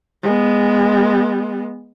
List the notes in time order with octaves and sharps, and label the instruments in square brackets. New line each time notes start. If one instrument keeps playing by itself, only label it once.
[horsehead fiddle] G#3 B3